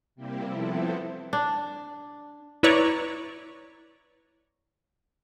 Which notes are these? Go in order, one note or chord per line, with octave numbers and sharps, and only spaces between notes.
C3 G3 A#3 C4 E4 G4
F3 B3 C4 E4 A4
D4
E4 B4 C#5 D5 A#5 C#6